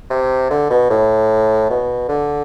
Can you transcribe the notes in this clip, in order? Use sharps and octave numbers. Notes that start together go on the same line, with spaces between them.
C3
D3
B2
A2
B2
D3